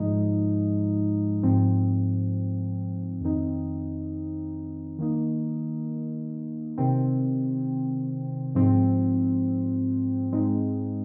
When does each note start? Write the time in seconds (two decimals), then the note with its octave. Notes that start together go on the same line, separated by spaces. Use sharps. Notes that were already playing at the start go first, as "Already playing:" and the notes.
Already playing: G#2 F3 G#3 D#4
1.43 G#2 F3 C4
3.21 F2 D#3 C4 D#4
4.99 D#3 A#3 D#4
6.78 C3 D#3 C4
8.55 G#2 F3 C4
10.32 G#2 G#3 C4 D#4